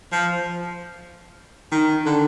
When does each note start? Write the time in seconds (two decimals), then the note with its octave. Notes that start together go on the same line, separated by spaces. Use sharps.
0.12 F3
1.72 D#3
2.06 D3